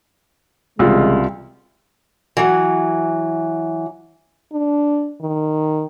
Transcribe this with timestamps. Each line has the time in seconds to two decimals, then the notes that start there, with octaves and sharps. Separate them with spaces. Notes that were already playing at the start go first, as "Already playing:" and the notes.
0.79 C2 C#3 E3 G#3 F4
2.37 E3 F#3
4.52 D4
5.21 D#3